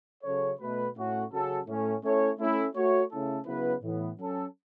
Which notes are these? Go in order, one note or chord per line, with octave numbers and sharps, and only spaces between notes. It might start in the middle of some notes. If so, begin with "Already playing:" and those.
C#3 F#3 C#4 A4 C#5
B2 A3 F#4 B4
A2 A3 C#4 F#4
C#3 F#3 C#4 A4
A2 A3 C#4
A3 C#4 E4 A4 C#5
A3 C#4 E4
A3 F#4 C#5
C#3 A3 C#4 E4 A4
C#3 F#3 B3 E4 B4
A2 E3 B3
F#3 C#4 A4